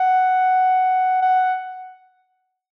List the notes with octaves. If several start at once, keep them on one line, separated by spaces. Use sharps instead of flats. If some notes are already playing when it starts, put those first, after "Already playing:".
Already playing: F#5
F#5